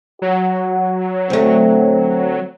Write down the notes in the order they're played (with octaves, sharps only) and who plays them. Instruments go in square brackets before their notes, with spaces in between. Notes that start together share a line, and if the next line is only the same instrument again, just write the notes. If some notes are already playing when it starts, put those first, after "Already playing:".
[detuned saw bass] F#3 [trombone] F#4
[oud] D2 A3 [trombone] C4